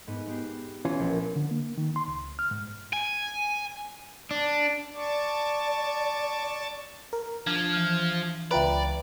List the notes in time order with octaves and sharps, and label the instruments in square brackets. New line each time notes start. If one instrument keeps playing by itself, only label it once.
[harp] G#2 B3 D#7
B3 G4 C7
[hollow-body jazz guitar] E3 C#4 F4
[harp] A#1
[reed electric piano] D3
A#3
D#3
C6
C#2
F6
G#2
[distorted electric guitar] G#5
[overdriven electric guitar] D4
[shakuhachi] D5 [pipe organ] A5 C#6 D6
[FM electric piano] A#4
[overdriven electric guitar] F3 [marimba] D4 [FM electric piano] G#6
[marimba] E3 F6
[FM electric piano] C#2 F4 B4 [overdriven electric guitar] D5 [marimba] E5 G5 A#5